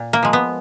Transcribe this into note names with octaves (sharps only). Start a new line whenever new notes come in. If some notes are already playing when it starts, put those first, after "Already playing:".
Already playing: A#2
A#3
F3 G#3
B3